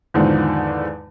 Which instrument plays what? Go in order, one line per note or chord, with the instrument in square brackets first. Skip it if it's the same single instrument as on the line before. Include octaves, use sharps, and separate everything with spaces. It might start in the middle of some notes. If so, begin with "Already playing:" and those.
[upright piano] E2 G#2 D3 D#3 F3